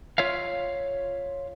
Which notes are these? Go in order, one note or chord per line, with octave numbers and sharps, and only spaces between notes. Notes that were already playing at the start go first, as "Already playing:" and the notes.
F4 C#5 E5 F5